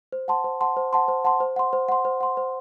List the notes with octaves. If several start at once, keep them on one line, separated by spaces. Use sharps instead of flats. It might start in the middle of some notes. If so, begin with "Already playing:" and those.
C5
F#5 A5 C6
C5
F#5 A5 C6
C5
F#5 A5 C6
C5
F#5 A5 C6
C5
F#5 C6
C5
F#5 C6
C5
F#5 C6
C5